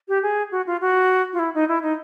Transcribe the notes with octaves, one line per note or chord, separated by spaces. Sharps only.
G4
G#4
F#4
F4
F#4
F4
E4
D#4
E4
D#4